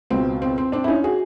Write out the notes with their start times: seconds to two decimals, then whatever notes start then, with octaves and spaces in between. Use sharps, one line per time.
0.11 C#2 B2 C4
0.42 C4
0.58 C4
0.72 C4 D4
0.84 E4
0.88 C#4 D#4
1.04 F#4 G#4